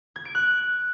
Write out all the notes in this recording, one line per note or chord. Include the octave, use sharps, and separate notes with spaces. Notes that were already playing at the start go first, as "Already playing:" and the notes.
G#6
D7
F#6